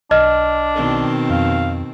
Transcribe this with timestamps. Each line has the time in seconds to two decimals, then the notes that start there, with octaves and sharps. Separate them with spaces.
0.11 B1 D4 D#5 F6
0.75 B2 D#3 C4
1.30 F2 F5